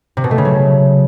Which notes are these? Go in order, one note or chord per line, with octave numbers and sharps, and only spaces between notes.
C3
B2
A3
C#3
F#3